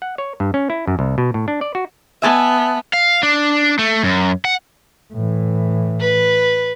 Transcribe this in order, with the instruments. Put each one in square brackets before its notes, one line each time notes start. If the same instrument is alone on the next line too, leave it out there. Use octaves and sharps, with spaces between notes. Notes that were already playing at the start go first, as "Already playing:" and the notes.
[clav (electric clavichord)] F#5
C#5
G2
C#4
E4
F#2
C2
B2
A2
D4
D5
F#4
[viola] B3 [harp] E5 G#5 A5
[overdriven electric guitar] F5
D4
A3
F#2
F#5
[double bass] A2 E3
[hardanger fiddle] B4